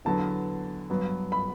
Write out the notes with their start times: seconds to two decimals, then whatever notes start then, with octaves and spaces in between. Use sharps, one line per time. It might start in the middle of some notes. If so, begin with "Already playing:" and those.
0.05 E2 D3 F#3 B3 A5
0.90 G2 F#3 B3
1.32 B5